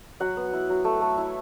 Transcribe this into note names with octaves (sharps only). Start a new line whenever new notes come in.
F#3 F#5
B3
E4
F#3
A3
A3
E4